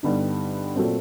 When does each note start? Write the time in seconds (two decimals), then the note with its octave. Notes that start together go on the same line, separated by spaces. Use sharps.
0.03 G2 D3 G3 B3 D#4
0.75 A#2 F#3 A3 C4